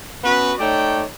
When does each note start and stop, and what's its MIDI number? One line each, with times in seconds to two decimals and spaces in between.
0.24 0.54 59
0.24 0.54 61
0.24 0.54 66
0.24 0.54 71
0.59 1.04 57
0.59 1.04 63
0.59 1.04 73
0.59 1.04 74
0.59 1.04 79